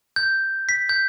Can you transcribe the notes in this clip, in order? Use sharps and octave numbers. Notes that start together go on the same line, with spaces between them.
G6
B6
G6